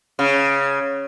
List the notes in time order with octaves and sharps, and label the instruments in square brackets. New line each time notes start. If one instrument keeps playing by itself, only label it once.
[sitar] C#3